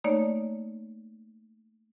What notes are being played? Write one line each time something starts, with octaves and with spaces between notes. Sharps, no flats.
A3 A#3 D#4 C#5 D5